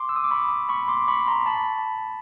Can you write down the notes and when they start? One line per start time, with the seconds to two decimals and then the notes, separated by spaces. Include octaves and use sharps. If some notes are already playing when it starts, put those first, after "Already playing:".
Already playing: C6 D6
0.09 E6
0.16 D#6
0.24 D6
0.31 B5 C#6
0.69 B5 C#6
0.88 C6 D6
1.08 B5 C#6
1.27 A#5 C6
1.46 A5 B5